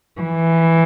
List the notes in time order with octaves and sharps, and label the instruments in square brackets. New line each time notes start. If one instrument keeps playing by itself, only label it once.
[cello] E3